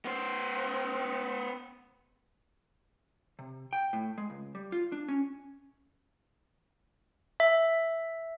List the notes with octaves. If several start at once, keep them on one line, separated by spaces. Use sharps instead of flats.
B3 C5
C3
G5
A2
G#3
C#2
G3
F4
D4
C#4
E5